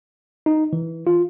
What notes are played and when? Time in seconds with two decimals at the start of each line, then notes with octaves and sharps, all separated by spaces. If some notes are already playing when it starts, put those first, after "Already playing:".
0.46 D#4
0.73 E3
1.07 F4